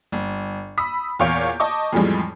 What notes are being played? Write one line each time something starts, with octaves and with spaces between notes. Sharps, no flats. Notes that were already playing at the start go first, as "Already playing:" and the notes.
G1
B5 D#6 E6 B6
E2 A#2 C#5 F5 G6 D7
D#5 A5 C#6 D6
F2 A2 E3 F3 G3 G#3